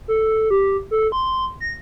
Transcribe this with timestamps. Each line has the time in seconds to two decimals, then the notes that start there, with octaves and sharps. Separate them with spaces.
0.08 A4
0.51 G4
0.91 A4
1.12 C6
1.60 A#6